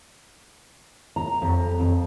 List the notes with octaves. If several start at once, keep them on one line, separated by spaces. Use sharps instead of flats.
A#5
F2
F2